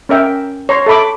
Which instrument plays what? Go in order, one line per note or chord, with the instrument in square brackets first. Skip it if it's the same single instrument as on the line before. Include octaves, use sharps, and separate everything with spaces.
[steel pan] C#4 A#4 E5 G5
C#5 A#5 C6
A4 E5 B5 D6